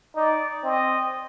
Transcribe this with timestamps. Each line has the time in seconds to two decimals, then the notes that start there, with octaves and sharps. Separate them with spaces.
0.15 D#4 D5
0.64 C4 D#5